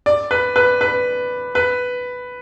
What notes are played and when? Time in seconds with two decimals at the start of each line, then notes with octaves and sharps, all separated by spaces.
0.06 D5
0.31 B4
0.56 B4
0.81 B4
1.55 B4